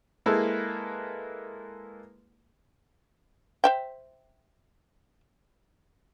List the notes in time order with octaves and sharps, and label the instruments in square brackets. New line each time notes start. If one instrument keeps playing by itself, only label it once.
[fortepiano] G#3 A#3 E4 A4 B4
[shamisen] C5 E5 G5